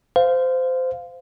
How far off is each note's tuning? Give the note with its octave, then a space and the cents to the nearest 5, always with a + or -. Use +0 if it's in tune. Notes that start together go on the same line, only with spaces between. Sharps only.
C5 -20 F5 +0